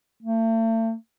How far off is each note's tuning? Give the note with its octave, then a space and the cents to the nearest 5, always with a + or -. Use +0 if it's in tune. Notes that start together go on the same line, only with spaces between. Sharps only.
A3 +40